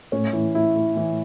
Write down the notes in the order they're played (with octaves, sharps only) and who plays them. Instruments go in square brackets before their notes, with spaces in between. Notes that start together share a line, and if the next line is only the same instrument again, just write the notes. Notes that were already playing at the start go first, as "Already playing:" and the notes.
[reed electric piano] A2 A3 [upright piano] C#4
[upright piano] E3
E4
E4
E3